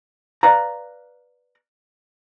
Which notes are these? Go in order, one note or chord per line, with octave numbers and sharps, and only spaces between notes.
B4 D5 F5 A#5